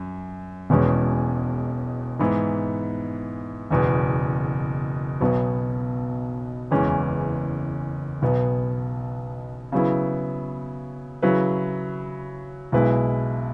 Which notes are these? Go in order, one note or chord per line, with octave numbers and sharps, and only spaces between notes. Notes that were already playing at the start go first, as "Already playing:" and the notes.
Already playing: F#2
E1 E2 B2 G#3 C#4
G#2 E3 B3 E4
F#1 E2 B2
B1 B2 F#3 B3
F#1 E2 E3 G#3 C#4
B1 B2 B3
C#3 F#3 B3 E4
C#3 F#3 E4 B4
B1 B2 G#3 E4 B4